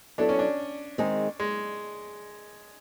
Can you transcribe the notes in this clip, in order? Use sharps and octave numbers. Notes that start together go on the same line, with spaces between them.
F#3 B3 D4 E4 A4 C#5
C#4
D4
D#3 G#3 C4 D#4 G#4
G#3